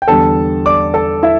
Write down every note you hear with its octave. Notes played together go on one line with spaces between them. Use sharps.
G5
E2 D3 G3 A4 A5
D5 D6
A4 A5
E4 E5